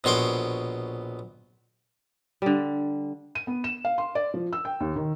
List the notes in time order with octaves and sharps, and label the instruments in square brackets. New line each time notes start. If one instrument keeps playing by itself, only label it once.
[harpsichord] A#1 B2 C#5 C6 D6
[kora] D3 G3
[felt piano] D#7
B3
E7
F5
C6
D5
F3
E6
G5
D#2
D#3